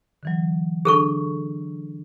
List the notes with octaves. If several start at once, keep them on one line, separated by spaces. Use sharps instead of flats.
D3 E3 F#3
D3 D4 G#4 A4 C#6